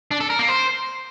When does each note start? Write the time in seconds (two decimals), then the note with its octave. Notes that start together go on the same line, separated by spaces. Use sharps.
0.11 D4
0.20 A4
0.30 A#4
0.39 A#3
0.49 C5